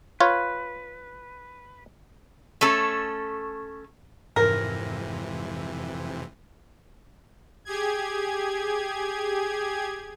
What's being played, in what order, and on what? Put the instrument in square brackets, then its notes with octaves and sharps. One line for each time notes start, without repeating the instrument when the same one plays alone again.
[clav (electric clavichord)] F4 C#5 [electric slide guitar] B4
[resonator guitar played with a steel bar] A3 C#4 A4
[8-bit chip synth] F2 C3 E3 [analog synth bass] G#2 [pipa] A#4
[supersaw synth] G4 G#4 G#6